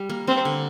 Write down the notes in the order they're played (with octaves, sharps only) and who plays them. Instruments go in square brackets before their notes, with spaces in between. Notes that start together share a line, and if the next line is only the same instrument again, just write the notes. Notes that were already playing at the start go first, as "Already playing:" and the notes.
Already playing: [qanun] G3
A#3
[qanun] A#3 [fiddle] C4
[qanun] D3